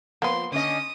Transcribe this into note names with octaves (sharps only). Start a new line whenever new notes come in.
F3 A#3 B3 C6
D3 C#4 D#5 D#6